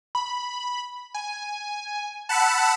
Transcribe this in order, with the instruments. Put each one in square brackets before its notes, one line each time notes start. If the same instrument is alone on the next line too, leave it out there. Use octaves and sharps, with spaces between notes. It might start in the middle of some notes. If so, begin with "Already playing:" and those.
[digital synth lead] B5
G#5
[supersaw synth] F#5 B5 E6 [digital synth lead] A5